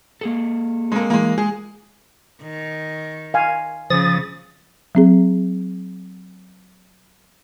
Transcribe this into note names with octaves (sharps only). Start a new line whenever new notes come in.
A#3 G#4 A4
G#3 A#3 C4 A4
E3 G#3 A#3
G#3 G#4
D#3
F5 G#5
C#3 F3 D#6 A6
F#3 C4 G#4